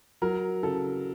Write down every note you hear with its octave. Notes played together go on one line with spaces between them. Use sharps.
F#3 A#4
C#3 A4